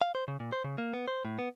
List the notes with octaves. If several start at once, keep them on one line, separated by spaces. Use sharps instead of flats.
F5
C5
C#3
A#2
C5
C#3
A#3
B3
C5
A2
B3